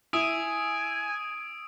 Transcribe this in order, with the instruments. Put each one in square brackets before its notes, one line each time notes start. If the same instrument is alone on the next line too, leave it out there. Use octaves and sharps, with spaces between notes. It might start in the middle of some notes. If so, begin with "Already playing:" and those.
[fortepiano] E4 [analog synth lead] G#5 [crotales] D#6 E6 D7